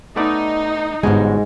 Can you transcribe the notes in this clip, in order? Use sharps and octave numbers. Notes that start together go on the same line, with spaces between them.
A3 B3 D#4 D5
G1 G#2 B2 G#3 G#5